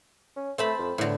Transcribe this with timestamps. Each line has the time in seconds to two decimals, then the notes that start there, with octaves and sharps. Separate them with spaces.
0.36 C#4
0.58 A3 C4 A5 B5
0.79 F2
0.98 E2 A2 D3